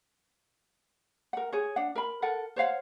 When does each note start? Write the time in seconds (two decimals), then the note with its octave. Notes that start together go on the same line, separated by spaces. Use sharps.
1.33 A#4 F#5
1.52 G#4 C#5
1.76 D4 F#5
1.95 A#4 B5
2.22 A4 A#4 F#5
2.56 C5 C#5 F5 F#5